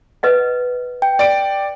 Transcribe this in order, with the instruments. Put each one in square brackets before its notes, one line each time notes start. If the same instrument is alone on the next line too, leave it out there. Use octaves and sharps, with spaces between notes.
[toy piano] B4 D#5 F#5
[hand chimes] G5
[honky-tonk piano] D5 D7